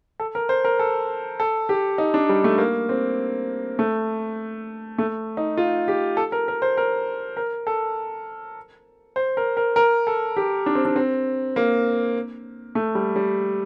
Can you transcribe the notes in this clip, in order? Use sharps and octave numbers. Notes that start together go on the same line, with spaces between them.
A4
A#4
C5
A#4
A4
A4
G4
D#4
D4
G3
A3
A#3
C4
A3
A3
D#4
F4
G4
A4
A#4
A#4
C5
A#4
A#4
A4
C5
A#4
A#4
A#4
A4
G4
D4
C4
D4
C4
A#3
A3
G3
G3